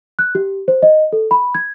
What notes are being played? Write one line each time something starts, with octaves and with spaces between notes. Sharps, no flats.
F#6
G4
C5
D#5
A4
B5
G#6